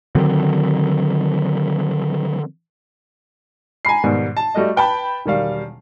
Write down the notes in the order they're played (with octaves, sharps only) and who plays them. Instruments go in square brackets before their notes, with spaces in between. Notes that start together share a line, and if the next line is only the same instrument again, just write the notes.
[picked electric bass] D3 D#3 F#3 C4
[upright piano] G#5 A#5 B5 C7
G#2 B2 D#3 G3
A5
G3 A3 F#4 D#5
B4 G5 A5 B5
E1 D#3 G3 F5